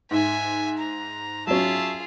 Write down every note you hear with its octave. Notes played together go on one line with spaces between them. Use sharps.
G#2 E5 G#5
A#5
F#3 C#4 F4 G#4 E5 A5